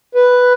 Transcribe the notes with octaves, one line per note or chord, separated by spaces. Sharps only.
B4